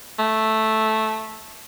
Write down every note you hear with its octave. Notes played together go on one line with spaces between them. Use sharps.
A3